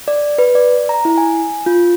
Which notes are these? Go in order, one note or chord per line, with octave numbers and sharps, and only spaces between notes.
D5
B4
D5
A#5
E4
G#5
F4